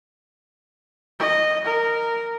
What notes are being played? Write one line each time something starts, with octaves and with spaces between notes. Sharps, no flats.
D#5
A#4